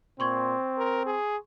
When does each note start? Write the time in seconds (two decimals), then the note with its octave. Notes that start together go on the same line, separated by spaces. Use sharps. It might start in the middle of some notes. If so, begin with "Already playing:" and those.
0.20 A#2 C4 C6 C#6 G#6
0.78 A#4
1.06 G#4